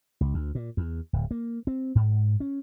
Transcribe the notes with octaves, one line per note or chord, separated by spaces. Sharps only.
C#2
D2
A#2
E2
D1
A#3
C4
G#2
C#4